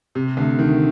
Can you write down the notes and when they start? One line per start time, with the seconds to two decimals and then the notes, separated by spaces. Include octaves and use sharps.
0.15 C3
0.37 D2
0.59 D#3